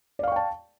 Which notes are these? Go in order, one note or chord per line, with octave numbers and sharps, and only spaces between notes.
D5 F5 G5 A5 C#6